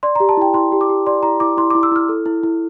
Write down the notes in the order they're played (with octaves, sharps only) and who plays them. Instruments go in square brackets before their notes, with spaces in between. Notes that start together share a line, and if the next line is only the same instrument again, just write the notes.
[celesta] D5 C6
A#5
G4
A5
E4 G5
E4 C6
G4
D6
G4
D5 C6
E4 A#5
E4 D6
E4 C6
D6
E4
E6
E4 F6
A4
E4
E4